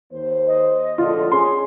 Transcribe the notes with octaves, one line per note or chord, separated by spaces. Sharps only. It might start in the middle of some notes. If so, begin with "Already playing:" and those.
D#2 C5
D#5
A#1 A2 D3 F4
C#4 G#4 C6